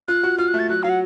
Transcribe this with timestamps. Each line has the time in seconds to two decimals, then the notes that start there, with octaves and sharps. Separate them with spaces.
0.08 F4 F#6
0.23 F#4
0.38 F4 F6
0.48 F#6
0.54 A3
0.59 A6
0.69 F#3 F#6
0.83 F#3 F5
0.89 F#5